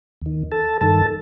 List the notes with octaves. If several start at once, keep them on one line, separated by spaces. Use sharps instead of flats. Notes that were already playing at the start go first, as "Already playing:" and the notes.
D#2 D#3
A4 A5
G2 D#3 A4 A5